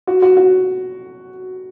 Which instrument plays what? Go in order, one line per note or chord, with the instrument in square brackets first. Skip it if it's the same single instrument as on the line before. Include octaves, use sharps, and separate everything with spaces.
[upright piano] F#4
F#4
F#4